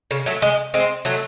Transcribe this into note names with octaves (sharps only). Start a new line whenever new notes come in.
C#3
F#3 A3
G#3
G#3 C4
F#3 A3